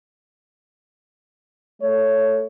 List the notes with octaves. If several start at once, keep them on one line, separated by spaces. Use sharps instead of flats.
A3 C#5